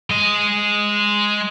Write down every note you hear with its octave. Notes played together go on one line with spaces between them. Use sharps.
G#3 D#5